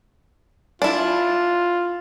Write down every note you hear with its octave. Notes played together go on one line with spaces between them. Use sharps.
D4 E4 F4